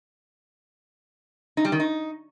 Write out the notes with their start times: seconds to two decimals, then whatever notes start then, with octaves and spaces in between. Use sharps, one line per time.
1.57 D#4
1.65 G3
1.72 D#3
1.80 D#4